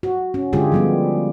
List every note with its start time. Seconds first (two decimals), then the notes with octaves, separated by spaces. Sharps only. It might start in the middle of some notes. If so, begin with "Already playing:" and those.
0.03 F#4
0.34 C#4
0.53 D3 G#3 F4 G4 G#4
0.72 F3 G3 B3